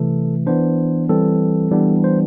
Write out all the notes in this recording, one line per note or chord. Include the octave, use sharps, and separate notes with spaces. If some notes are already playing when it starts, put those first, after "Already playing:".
Already playing: C3 E3 A3 A4
E3 B3 D4 C5
E3 G3 C4 A4
E3 G3 B3 D4
C5